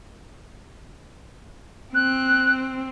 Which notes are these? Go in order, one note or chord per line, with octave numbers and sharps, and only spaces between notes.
C4 F#6